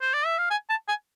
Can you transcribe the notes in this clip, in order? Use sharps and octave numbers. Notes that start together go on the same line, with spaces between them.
C5
D5
E5
F5
G#5
A5
G#5